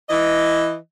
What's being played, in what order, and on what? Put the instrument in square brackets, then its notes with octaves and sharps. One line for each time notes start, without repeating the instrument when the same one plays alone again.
[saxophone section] E3 D#5